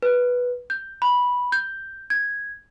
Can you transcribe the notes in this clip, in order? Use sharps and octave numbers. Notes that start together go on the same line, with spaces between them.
B4
G6
B5
G6
G#6